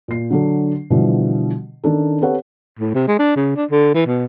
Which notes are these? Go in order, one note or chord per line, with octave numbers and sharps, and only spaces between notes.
A#2 C7
D3 F#3 D4 A4
B2 D3 E3 F3 G3
D#3 C#4 D4 A4
C4 G4 A4 B4 C#5 F#5
A2
C3
G#3
D4
C#3
D4
D3
E3
B2